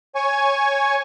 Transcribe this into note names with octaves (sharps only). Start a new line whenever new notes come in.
C#5 G#5 C#6